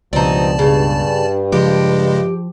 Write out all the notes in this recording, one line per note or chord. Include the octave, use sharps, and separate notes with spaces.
C#2 G2 B2 F3 C4 D#4 D5 A5
G2 C#3
C#3 F3 G#3 G4